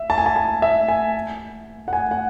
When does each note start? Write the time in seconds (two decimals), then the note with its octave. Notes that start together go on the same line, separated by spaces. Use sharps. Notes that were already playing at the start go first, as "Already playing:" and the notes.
Already playing: E5
0.10 A5
0.18 G#5
0.26 A5
0.36 G#5
0.62 E5
0.88 G#5
1.88 F#5
1.93 G#5
2.11 F#5